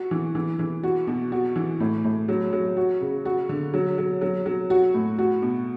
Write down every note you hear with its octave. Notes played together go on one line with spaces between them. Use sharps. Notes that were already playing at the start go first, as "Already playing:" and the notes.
Already playing: F#4
E3
E3
E3
F#4
B2
F#4
E3
A2
A2
F#3
F#3
F#4
C#3
F#4
D3
F#3
F#3
F#3
F#3
F#4
A2
F#4
B2